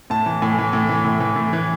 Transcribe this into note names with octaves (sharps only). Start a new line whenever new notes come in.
A2 A5
E3
A2 G#5
E3
A2
E3
A2
E3
A2
E3